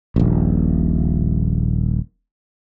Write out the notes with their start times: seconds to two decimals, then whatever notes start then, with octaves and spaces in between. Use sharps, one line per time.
0.16 D#1 A#1